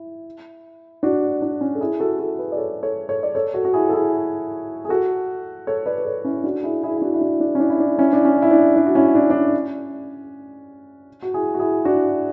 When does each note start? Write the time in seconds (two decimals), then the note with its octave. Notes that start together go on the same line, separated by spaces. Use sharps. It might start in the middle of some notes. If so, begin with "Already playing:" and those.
Already playing: E4
1.03 D4 F#4
1.42 D4
1.61 C#4
1.75 A4
1.81 E4 G#4
2.00 F#4 A4
2.19 F#4 A4
2.39 G#4 B4
2.52 D5
2.57 A4 C#5
2.83 A4 C#5
3.09 A4 C#5
3.23 D5
3.35 A4 C#5
3.54 F#4 A4
3.65 F#4
3.73 E4 G#4
3.89 A4
3.93 E4 G#4
4.85 G#4
4.89 F#4 A4
5.67 A4 C#5
5.86 B4 D5
5.98 B4
6.05 A4 C#5
6.24 C#4 E4
6.44 D4 F#4
6.63 E4 G#4
6.83 E4 G#4
6.97 E4
7.02 D4 F#4
7.14 E4
7.21 D4 F#4
7.40 D4
7.55 C#4
7.60 D4
7.70 E4
7.80 D4
7.99 C#4 E4
8.13 D4
8.25 C#4
8.42 E4
8.51 D4
8.76 D4
8.86 F#4
8.95 C#4 E4
9.15 D4
9.30 D4
9.34 C#4
11.22 F#4
11.34 E4 G#4
11.54 F#4
11.59 E4 G#4
11.85 D4 F#4